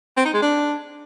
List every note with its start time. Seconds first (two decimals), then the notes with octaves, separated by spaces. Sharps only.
0.17 C4
0.25 D#4
0.34 G#3
0.42 D4